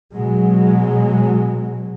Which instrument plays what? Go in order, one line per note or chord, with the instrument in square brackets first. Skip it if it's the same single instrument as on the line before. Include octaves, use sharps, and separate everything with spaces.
[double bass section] B2 F#3 G#3